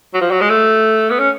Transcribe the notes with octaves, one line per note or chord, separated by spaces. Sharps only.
F#3
F3
F#3
G#3
A3
B3
C#4